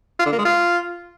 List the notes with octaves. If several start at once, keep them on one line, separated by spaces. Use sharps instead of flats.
F4
D3
A#3
G#3
F4